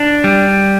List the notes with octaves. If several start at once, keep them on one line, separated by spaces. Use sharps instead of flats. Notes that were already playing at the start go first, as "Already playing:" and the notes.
Already playing: D4
G3